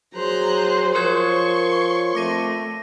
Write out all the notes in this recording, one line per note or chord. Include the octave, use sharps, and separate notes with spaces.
F#3 G#4 C5 A#5 F#6
F3 A#4 C#5 C6 C#6 G#6
F2 A3 D6 A#6 D#7